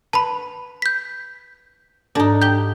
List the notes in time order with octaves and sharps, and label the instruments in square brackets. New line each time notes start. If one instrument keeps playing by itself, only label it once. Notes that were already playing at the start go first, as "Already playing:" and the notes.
[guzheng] B4 [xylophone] A5 B5
[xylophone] G6 B6
[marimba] G#2 A4 A#6 [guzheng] D4 D#4
[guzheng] G4 [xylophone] G6 G7